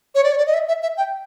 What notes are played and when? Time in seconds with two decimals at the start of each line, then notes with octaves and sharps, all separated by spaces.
0.15 C#5
0.24 D5
0.32 C#5
0.38 D5
0.47 D#5
0.54 E5
0.68 E5
0.82 E5
0.97 G5